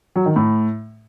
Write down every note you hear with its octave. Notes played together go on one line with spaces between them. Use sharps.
F#3
D#3
A2